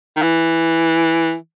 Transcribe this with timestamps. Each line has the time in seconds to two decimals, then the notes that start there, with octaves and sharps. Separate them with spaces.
0.16 D#3
0.22 E3